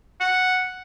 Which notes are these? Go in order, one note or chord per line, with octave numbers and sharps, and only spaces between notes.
F#5